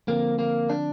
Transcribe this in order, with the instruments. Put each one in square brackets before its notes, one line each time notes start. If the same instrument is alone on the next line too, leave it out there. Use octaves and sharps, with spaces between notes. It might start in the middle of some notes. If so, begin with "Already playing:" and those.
[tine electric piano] D3 F3 C4 [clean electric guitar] A#3
[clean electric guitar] A#3
D4